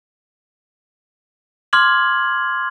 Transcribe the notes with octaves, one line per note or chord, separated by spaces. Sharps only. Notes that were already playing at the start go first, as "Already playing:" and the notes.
C6 D6 F6 G#6 F#7